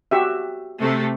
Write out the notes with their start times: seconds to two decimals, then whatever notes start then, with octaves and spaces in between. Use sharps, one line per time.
0.11 F#4 G4 E5
0.80 C3 A3